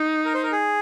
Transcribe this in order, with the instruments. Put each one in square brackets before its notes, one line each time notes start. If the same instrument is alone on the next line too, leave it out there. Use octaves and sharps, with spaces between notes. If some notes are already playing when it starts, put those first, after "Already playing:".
Already playing: [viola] D#4
[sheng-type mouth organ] A#4
C5
A#4
G#4